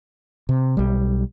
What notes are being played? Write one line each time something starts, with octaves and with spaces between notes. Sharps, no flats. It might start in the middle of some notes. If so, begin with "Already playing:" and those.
C3
B1 G3